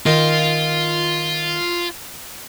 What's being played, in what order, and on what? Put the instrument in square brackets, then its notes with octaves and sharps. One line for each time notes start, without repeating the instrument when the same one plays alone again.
[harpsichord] D#3 [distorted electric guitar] F4